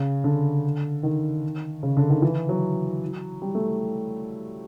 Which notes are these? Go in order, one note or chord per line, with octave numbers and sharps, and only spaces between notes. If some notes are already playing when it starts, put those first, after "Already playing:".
Already playing: C#3
D3
D#3
C#3
D3
D#3
E3
F#3
G3
A3